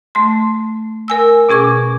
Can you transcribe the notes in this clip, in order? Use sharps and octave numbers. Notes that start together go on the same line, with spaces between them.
A3 C6
A#4 G#5 E6
B2 C#4 G#4 C#6 D6